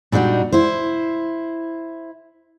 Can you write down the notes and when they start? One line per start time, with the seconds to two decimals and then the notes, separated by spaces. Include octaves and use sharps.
0.12 A#2 G3 D4 D#4 F#4
0.52 E4 C5